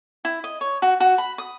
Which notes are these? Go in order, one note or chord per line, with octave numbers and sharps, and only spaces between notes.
E4
D#5
C#5
F#4
F#4
B5
D#6